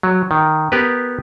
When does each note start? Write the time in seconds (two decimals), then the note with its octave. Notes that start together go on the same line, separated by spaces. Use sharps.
0.03 F#3
0.31 D#3
0.72 B3 G4 A#4 B4